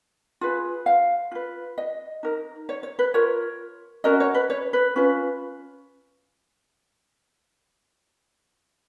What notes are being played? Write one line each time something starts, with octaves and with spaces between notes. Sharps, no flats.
F4 G#4 B4
F5
F4 B4
D#5
D#4 A#4
C#5
C#5
B4
F4 A#4 C#5
C#4 F#4 A#4 D#5
C#5
B4
C#5
B4
C#4 F4 B4